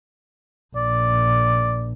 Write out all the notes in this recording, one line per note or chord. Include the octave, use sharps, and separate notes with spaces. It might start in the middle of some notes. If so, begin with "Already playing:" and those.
A#1 D5